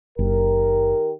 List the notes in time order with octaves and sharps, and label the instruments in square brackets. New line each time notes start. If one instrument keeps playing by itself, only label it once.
[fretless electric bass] F#1 [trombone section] D#3 G4 A#4